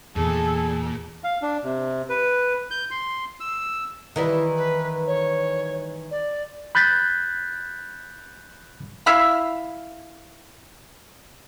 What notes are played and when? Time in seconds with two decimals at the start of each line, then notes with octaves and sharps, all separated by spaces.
0.16 E2 A#2 E3 G#4 A4
1.24 F5
1.42 D4
1.64 C3
2.09 B4
2.71 G6
2.91 C6
3.40 E6
4.16 D#3 E3 G3 E4
4.56 B4
5.06 C#5
6.10 D5
6.75 B5 F#6 G6 A6 B6
9.06 E4 E5 F5 B5